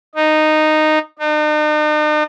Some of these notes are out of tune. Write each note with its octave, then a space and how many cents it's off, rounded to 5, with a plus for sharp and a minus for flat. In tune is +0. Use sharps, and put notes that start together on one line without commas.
D#4 -10
D#4 -45